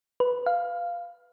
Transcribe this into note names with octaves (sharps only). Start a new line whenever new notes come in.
B4
F5